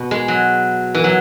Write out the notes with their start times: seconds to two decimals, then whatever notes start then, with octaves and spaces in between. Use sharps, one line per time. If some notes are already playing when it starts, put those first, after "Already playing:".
Already playing: B2
0.11 G#3
0.28 F#3
0.95 E3
1.04 F#3